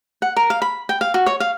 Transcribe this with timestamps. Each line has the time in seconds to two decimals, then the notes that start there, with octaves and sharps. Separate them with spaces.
0.22 F#5
0.37 A#4
0.50 F5
0.62 B5
0.89 G5
1.01 F5
1.14 F#4
1.26 C#5
1.40 F5